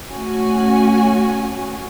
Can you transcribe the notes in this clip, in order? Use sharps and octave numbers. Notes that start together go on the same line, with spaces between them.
A3 C#4 F#4 G#5